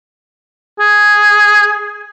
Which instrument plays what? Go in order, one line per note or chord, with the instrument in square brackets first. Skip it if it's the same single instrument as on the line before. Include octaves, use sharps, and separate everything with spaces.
[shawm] G#4